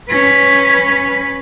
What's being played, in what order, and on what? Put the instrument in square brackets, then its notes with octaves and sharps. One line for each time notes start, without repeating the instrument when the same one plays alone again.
[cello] C#4 B4